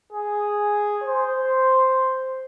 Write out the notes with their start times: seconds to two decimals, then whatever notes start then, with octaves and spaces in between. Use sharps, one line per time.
0.13 G#4
1.04 C5